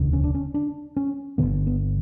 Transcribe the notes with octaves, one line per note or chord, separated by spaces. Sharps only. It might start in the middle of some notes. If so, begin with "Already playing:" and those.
Already playing: E1 D2 C#3
C#4
D4
C#4
D4
C#4
G1 F#2 D3 B3
B3